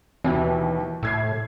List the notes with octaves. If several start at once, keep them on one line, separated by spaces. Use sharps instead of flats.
D#2 B2 E3
A2 E6 G#6 C7